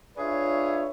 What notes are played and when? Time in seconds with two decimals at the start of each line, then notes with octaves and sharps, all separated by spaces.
0.17 D4 F4 G#4 B4 C#5 E5